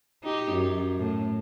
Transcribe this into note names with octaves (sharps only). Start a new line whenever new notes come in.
D#4 G4
F#2
A2